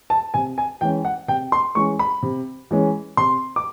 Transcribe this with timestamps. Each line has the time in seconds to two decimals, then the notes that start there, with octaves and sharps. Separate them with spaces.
0.10 A5
0.34 C3 G#5
0.58 G#5
0.81 E3 G#3 C#4 G5
1.05 F#5
1.28 C3 G5
1.52 C6
1.75 E3 G#3 C#4 C#6
1.99 B5
2.23 C3
2.71 E3 G#3 C#4
3.17 C3 C6
3.56 D6